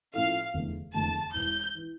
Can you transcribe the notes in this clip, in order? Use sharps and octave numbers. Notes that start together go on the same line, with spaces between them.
A2 F3 C#4 E4 A4 F5
F1 E2 D3 A3
F1 E2 D3 A3 A5
E1 E2 E3 G6
E3